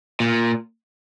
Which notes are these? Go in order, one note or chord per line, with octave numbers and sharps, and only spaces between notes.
A#2